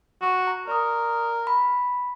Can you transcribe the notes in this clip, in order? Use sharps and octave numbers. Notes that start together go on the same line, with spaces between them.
F#4
A#5
A#4 D5 C#6 D#6
B5